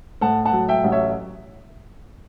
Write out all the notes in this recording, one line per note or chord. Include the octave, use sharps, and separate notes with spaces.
A2 F#5 A5
F#5 A5
F#3
E5 G5
A1
C#5 E5